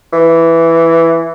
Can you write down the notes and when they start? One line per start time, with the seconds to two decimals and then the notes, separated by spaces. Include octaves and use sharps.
0.13 E3